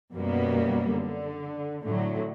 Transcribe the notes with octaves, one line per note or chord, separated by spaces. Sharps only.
F#2 B2 G3 A#3 B3
D3
A2 D3 F#3